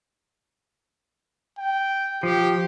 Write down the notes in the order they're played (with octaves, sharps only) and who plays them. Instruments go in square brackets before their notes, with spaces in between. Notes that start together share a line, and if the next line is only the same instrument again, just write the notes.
[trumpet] G5
[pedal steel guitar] F3 [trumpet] G4